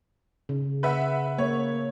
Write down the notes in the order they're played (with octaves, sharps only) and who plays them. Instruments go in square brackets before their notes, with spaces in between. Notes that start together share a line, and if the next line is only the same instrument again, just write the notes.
[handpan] C#3
[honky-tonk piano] B4 E5 F#5
[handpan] A#3 [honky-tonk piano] C#5